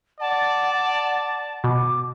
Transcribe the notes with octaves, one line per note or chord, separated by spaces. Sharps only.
D5 F#5 A5
B2 D6